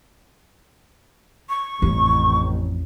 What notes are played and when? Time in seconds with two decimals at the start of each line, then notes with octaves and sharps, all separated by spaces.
1.49 C#6
1.82 A1 F2